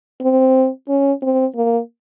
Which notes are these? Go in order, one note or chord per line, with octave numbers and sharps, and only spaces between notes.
C4
C#4
C4
A#3